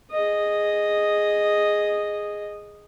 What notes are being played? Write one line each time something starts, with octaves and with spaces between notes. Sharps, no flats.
G#4 D#5